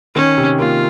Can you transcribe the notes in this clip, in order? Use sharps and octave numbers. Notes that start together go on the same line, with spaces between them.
D#3 C#4
C3
A#3 F4